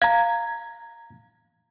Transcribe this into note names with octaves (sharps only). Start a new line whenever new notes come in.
F5 A#5 G#6